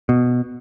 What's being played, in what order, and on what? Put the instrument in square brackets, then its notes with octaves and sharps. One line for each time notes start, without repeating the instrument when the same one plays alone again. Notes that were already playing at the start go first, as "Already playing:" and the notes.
[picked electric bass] B2